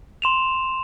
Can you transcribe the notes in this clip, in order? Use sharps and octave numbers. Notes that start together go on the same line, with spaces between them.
C6 E7 F7